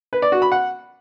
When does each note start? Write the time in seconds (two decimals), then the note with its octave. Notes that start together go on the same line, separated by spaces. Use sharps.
0.13 B4
0.22 D5
0.32 F#4
0.42 B5
0.52 F#5